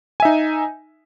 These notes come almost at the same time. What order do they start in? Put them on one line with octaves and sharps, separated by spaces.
G#5 E5 D#4